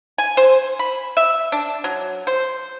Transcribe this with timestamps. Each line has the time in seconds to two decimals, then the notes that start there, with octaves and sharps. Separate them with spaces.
0.18 G#5
0.37 C5
0.79 B5
1.17 E5
1.52 D4
1.84 F#3
2.27 C5